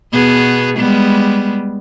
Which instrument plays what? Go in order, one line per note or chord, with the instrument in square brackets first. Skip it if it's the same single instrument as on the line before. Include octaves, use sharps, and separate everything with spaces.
[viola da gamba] B2 B3 G#4
G3 G#3 B3